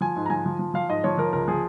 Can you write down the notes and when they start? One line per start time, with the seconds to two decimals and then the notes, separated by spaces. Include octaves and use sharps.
0.01 F3 G#5
0.16 G#2
0.26 A#5
0.30 F3 G#5
0.46 F3
0.59 F3
0.74 F3 F5
0.89 G#2 D#5
1.04 F3 C#5
1.18 F3 A#4
1.33 C#2 A#4
1.48 F3 G#4